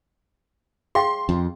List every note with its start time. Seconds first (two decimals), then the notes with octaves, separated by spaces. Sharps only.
0.95 G#4 F5 G5 C6
1.29 F2